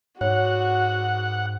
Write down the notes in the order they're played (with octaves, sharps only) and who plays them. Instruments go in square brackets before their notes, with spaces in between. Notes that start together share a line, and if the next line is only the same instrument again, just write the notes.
[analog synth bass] G#2 [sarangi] F#4 [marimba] C#5 [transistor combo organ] F#5